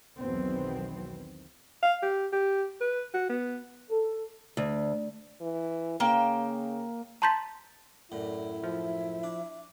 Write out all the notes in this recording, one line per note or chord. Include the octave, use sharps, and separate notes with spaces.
B1 E2 D#3 F#3 B3 C4
F5
G4
G4
B4
F#4
B3
A4
D2
E3
C#3 A#3 G5
A5 A#5 C6 G6 A6 B6
F#2 A2 E4 D5
F3 E5
D4